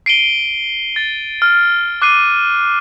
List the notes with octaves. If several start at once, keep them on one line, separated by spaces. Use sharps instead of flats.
C7 D7 D#7 G7
A6
F6
D6 F#6 C7 D#7